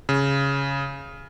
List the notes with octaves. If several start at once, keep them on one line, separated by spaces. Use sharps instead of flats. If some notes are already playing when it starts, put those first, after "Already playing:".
C#3